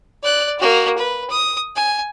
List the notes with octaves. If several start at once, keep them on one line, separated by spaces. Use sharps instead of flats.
D5 F#6
A#3 F#4
B4
D#6
G#5